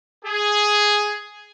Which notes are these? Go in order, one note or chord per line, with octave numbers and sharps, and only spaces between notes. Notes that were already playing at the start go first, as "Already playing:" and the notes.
G#4